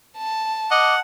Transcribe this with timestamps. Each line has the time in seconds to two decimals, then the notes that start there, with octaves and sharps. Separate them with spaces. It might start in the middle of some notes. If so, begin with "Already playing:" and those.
0.18 A5
0.71 D#5 F#5 D6